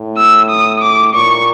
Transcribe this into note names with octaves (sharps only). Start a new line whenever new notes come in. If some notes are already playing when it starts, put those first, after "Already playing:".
Already playing: A2
E6
D#6
D6
A#2 C#6